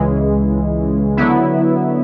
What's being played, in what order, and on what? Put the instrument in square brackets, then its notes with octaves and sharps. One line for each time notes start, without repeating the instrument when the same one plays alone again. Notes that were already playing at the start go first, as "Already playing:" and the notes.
Already playing: [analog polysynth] C#2 C#3 E3 G#3
D3 F#3 B3 E4